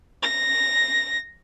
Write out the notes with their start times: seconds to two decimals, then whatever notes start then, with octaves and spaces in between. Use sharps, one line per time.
0.22 A#6